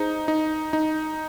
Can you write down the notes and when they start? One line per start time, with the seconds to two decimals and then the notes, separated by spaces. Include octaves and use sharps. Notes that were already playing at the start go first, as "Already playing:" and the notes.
Already playing: D#4 G#4 C5 D#5 A#5
0.28 D#4
0.73 D#4